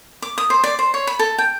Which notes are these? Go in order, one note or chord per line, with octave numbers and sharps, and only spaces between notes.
D6
D#6
C5
D5
C5
C#5
B5
A4
G5